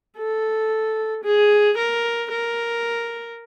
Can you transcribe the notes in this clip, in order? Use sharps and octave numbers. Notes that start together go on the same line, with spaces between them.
A4
G#4
A#4
A#4